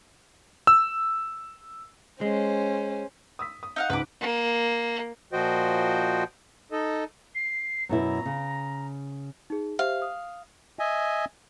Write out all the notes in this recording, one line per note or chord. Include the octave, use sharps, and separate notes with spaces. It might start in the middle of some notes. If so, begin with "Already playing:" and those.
E6
G#3 C#4 C5
D#6 E6 B6
D#6
D#4 F5 F#5
C#2 G#2 B4 F#5 D6
A#3
A#2 F3 F#4 C5 D#5 G5
D#4 A4 D#5
C7
F#2 B2 E4 A#5
C#3
D#4 G#4
G4 C5 E5 F5
D#6
D#5 E5 G#5